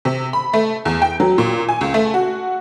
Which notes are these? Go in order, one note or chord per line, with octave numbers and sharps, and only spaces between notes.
C3
B5
A3
E2
G5
F#3
A#2
G#5
C#2
A3
F#4